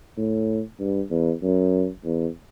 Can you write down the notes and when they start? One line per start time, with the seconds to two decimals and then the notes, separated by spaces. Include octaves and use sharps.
0.17 A2
0.80 G2
1.10 E2
1.43 F#2
2.05 E2